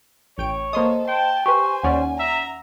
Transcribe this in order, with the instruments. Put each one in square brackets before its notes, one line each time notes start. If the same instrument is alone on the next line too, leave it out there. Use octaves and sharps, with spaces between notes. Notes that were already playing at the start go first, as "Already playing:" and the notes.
[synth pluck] A1 G5 D7 [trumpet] C#5
[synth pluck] A#3 C6 D#6 [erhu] A4 [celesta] C5 D#5
[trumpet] G5 [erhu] A5 [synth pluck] C6
[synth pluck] G4 B4 [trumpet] C5 [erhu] G#5 [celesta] C#6
[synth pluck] D#2 C#4 D5 [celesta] F#5
[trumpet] E5 [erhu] A#5